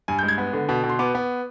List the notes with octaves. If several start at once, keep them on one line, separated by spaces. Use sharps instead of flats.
G2 G#5
G6
G#3
G#6
B3
D3
B2
B2
C6
B3 D6
B3